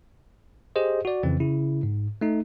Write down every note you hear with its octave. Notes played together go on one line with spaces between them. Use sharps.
G4 G#4 C5 D#5
F#4 D5
F2 C#3 E3 C4
C#3 E4
G#2
A3 D#4